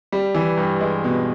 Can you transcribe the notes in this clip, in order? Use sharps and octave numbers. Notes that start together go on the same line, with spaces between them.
G3
E3
G2
G#3
B2